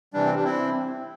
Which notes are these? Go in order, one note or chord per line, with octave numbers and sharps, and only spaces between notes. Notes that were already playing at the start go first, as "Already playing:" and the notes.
C3 E3 G3 D4
C4
D4
C4 E4